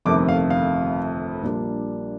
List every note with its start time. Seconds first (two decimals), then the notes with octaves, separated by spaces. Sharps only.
0.05 G1 F2 C3 D#3 A3 D6
0.29 F5
0.50 F5
1.43 A#1 A#2 G3 A#3 D4